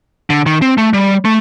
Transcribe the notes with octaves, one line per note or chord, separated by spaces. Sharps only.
D3
D#3
C4
A3
G3
A3